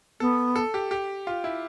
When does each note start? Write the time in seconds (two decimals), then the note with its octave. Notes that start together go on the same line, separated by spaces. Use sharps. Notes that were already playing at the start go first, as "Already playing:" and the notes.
0.20 B3 A4
0.56 A4
0.74 G4
0.91 G4
1.27 F4
1.44 E4